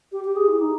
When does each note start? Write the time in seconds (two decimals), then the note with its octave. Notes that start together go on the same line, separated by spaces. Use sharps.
0.12 G4
0.24 G4
0.36 G#4
0.47 E4
0.60 D#4